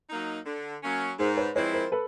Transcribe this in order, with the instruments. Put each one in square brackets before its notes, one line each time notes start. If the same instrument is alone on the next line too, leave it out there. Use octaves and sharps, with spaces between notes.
[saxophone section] F#3 A#3 D#4
D3
F#3 A#3 C#4
[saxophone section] G#2 [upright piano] A#4 C5
[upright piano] B4 C#5
[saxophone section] F3 G#3 C4 E4 [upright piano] B4 C#5
[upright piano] A#4 C5
A4 B4